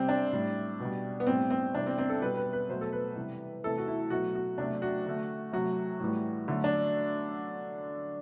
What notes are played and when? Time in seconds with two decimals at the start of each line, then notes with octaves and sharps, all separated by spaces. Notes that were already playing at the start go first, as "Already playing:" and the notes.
Already playing: C3 G3 C4
0.08 D4
0.32 A2 G3
0.80 B2 G3
1.20 B3
1.26 A2 G3 C4
1.50 C4
1.75 C3 E3 G3 D4
1.86 C4
1.98 C4
2.10 A4
2.21 B2 G3 B4
2.37 B4
2.53 B4
2.69 B2 F#3 A3 C5
2.81 A4
2.93 B4
3.16 C3 E3 G3
3.64 C3 E3 A3 A4
3.78 F#4
3.88 E4
4.10 B2 F#3 A3 F#4
4.35 F#4
4.58 C3 F#3 A3 D4
4.82 F#4
5.06 D3 A3
5.52 C3 F#3 A3 F#4
6.00 A2 E3 G3
6.48 D3 F#3 A3
6.64 D4